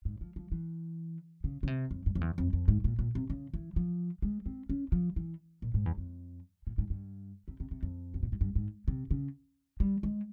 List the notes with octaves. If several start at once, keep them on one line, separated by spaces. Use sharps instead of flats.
G#2
F3
F3
E3
C#3
C#3
C3
F2
G2
F2
E2
F2
F2
G#2
A#2
A#2
C3
C#3
E3
F3
G#3
C4
C#4
F3
E3
A#2
G#2
E2
F2
A#2
G#2
G2
C3
C3
C3
F2
C3
A#2
G#2
G2
G#2
C3
C#3
G3
G#3